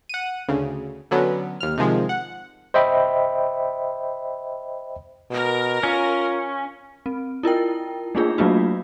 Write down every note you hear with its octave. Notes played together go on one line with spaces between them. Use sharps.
F#5 D#7
D2 C#3
D3 F#3 B3 C#4
D#2 F6
C3 D#3 F3 G#3
F#5
C5 D#5 E5 G5 B5
B2 A#4
C#4 F4
C4
E4 F4 A#4 G5
A3 A#3 D4 D#4 F4 G#4
F#3 A3 A#3 D4 F4 F#4